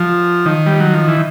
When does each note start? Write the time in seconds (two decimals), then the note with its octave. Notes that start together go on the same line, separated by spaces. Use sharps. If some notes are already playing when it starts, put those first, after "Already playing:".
Already playing: F3
0.46 D#3
0.66 G3
0.80 F#3
0.94 F3
1.08 E3